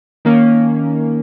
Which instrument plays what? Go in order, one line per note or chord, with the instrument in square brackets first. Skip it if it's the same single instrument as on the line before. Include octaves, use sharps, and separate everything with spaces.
[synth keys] D#3 A#3 C#4